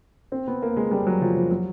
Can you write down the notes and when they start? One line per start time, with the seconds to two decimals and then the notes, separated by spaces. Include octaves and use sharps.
0.32 C4
0.47 B3
0.62 A#3
0.77 G#3
0.91 G3
1.07 F#3
1.21 F3
1.36 F3
1.51 F#3